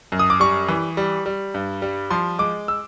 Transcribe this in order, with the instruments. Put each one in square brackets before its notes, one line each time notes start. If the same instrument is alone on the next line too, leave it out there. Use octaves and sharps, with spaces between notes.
[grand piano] F#2
D#6
D6
G3 C#6
E3
G3
G3
G2
G3
F3 C6
G#3 D6
E6